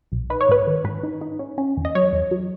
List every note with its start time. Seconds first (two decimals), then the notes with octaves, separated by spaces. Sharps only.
0.12 B1
0.30 D#4 B4
0.41 C#5
0.49 G#2 B4
0.67 D#3
0.84 G#2 B4
1.03 D#4
1.21 D#4
1.39 C#4
1.58 C#4
1.77 E2
1.85 D#5
1.95 F#3 C#5
2.13 E2
2.31 F#3